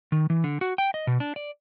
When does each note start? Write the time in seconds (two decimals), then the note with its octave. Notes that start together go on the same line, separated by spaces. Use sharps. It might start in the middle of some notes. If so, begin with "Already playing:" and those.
0.12 D#3
0.30 E3
0.44 D3
0.61 F#4
0.78 G5
0.94 D#5
1.07 B2
1.20 D4
1.36 D5